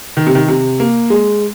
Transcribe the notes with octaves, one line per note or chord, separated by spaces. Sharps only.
D#3
C3
D#3
C3
A#3
G#3